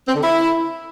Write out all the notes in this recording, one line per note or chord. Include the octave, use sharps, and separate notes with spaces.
C4
D3
E4